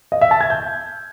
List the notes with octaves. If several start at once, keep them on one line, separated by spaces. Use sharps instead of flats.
D#5
E5
A5
G#6
G6